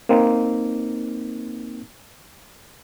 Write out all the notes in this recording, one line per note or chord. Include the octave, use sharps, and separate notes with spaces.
A#3 C4 D#4